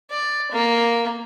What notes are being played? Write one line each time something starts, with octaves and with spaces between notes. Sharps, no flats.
D5
A#3